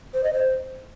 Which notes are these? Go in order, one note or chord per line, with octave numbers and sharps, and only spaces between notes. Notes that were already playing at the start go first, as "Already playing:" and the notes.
C5
D#5
C5